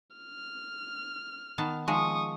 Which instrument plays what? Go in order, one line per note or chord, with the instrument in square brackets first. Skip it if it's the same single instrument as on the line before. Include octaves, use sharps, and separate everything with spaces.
[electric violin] F6
[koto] D#3 B3 A5
[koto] D#3 F3 G#3 [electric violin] C#6 D#6